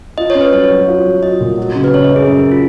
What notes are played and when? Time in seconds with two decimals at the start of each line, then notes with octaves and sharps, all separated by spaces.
0.18 F4 D#5
0.30 C#5
0.35 C#4
0.41 B4
0.53 F#3 C#5
0.70 F#3
0.88 F4
1.05 F#3
1.22 F4 D#5
1.40 A#2
1.58 F#3
1.75 C#3
1.84 B4
1.93 C#3 C#5
2.04 D#5
2.10 F#2
2.16 G#4
2.27 F#2 A#4
2.39 G#4
2.52 F4